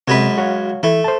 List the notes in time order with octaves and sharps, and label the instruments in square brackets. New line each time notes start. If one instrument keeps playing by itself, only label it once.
[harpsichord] F#2 G#3 B4 [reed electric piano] C3
[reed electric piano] F#4 C#5 F5
[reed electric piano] E3 E4 [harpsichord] A3
[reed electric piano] C5 A5